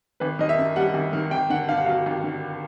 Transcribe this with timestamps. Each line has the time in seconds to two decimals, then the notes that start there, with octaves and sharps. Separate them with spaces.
0.20 G#1 B4
0.39 D#3 D#5
0.49 E5
0.58 F#2
0.76 G3 F#5
0.94 G#1
1.13 D#3
1.31 G#1 G5
1.50 D3 F#5
1.68 G2 F5
1.77 F#5
1.86 F#3 F5
2.06 G#1
2.24 D3